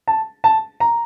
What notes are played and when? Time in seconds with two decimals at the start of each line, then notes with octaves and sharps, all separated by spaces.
0.08 A5
0.44 A5
0.80 A#5